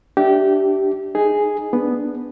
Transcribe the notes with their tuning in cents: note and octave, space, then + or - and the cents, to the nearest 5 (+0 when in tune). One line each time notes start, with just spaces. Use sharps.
D4 +0 G4 -20 E5 -5
D#4 +0 G#4 +0
B3 +0 D4 +0